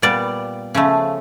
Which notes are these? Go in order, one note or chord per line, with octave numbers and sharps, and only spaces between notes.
A#2 G3 B3 D5
C#3 F3 A3